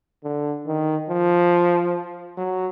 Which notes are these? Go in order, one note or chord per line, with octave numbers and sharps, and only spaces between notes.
D3
D#3
F3
F#3